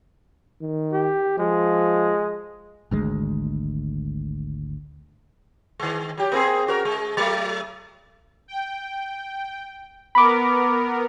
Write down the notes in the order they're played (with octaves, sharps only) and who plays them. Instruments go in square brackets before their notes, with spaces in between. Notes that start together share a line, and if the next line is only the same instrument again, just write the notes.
[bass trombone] D#3
[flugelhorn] G4
[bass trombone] F3 [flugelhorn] G#3
[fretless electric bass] G#1 D2 G#3
[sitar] D#3 G#3
F#3 G4
A#3 C4 G#4
C#4 F#4 A#4
G#3
F#3 A3
[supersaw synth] G5
[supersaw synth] B3 A#4 [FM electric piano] B5 D6